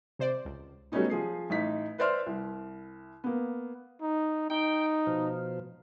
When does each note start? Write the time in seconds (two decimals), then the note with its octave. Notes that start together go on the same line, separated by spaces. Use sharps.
0.19 C3 C5 D5
0.45 C#2
0.92 F#3 G3 A3 B3 C#4 D#4
1.10 F3 G#4 C7
1.50 A1 D#4 B6
1.98 B4 C5 D5 E5 C6 F6
2.26 C2
3.24 A#3 B3
4.02 D#4
4.50 D#4 G5
5.07 B2 F3